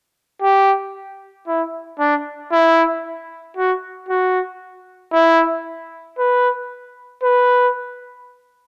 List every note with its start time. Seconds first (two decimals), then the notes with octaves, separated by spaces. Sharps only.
0.42 G4
1.47 E4
1.99 D4
2.52 E4
3.57 F#4
4.09 F#4
5.13 E4
6.18 B4
7.23 B4